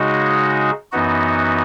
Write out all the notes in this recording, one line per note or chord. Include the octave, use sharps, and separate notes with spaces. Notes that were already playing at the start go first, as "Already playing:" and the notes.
Already playing: C#3 G#3 D#4 F#4
F#2 E3 B3 D#4 F#4